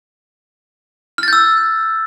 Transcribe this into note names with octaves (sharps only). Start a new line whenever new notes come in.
E6 F6 G6 A6